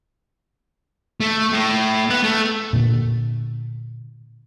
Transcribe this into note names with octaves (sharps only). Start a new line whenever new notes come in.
A3
A2
B3
A3
A#2 D3